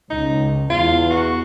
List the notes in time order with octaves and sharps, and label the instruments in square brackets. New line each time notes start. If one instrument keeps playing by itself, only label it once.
[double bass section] C#2 [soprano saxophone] D#4
[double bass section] E2 [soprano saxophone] F4
[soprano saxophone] F#4